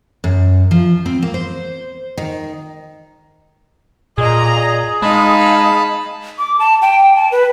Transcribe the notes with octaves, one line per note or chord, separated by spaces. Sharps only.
F#2
F3
C4
A#3
C5
D#3
A#2 G#4 D#5 A#5
G#3 D#4 F5 A5 B5
D6
A5
G5
A5
B4